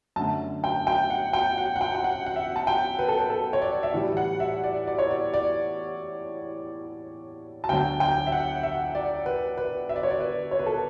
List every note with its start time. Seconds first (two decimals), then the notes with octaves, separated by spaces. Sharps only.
0.16 F#2 D3 A3 A5
0.64 G5
0.87 G5
1.10 F#5
1.33 G5
1.58 F#5
1.76 F#5
1.81 G5
1.95 G5
2.04 F#5
2.26 F#5
2.36 E5
2.56 A5
2.67 G5
2.99 B4
3.09 A4
3.19 B4
3.30 A4
3.53 C#5
3.62 D5
3.83 E5
3.93 A2 E3 G3 D5
4.17 F#5
4.40 E5
4.64 D5
4.87 D5
4.99 C#5
5.11 D5
5.34 D5
7.64 A5
7.69 D2 D3 F#3 G5
8.00 G5
8.27 E5
8.32 F#5
8.63 E5
8.95 D5
9.26 B4
9.57 B4
9.89 E5
9.96 D5
10.03 C#5
10.11 D5
10.20 B4
10.51 C#5
10.59 B4
10.66 A4
10.74 B4